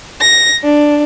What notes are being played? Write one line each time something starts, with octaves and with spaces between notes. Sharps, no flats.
A#6
D4